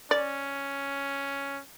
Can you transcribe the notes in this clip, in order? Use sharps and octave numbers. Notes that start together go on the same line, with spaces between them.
C#4 D5